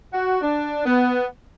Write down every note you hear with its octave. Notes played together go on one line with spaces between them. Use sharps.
F#4
D4
B3